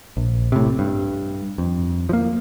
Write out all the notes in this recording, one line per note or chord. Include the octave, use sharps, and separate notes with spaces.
A#1
A2 C3
G2
F2
F3 A#3